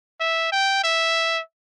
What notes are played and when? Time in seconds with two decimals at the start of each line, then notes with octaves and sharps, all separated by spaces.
0.20 E5
0.52 G5
0.84 E5